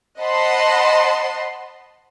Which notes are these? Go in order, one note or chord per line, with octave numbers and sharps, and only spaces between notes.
C5 D#5 F#5 A5 B5 C6